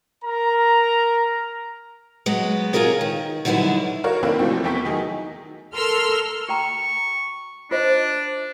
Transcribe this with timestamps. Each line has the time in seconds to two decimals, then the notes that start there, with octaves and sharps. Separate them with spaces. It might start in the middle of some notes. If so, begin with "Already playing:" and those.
0.24 A#4 A#5
2.26 F#3 G#3 B3
2.73 F4 F#4 G#4 A#4 C#5
3.01 D#3
3.45 D3 D#3 F#3 G3 E4 B4
4.04 F#4 A#4 C#5 D5 F5
4.23 D#3 A#3 C4 D4 E4 B4
4.39 B2 E3 F3 A3 C4
4.64 E2 B3 G5 C#6 B6
4.85 D#3 F#3 D#4 G#4
5.74 A4 A#4 C6 E6 F6
6.49 F#4 G5 A#5 C#6
7.71 D4 F4 C5 D#5